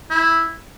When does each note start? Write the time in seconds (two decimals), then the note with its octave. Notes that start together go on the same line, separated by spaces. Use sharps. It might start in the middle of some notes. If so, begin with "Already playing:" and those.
0.11 E4